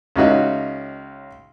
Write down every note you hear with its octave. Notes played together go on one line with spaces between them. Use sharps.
C#2 C#4 D#4 F#4 E5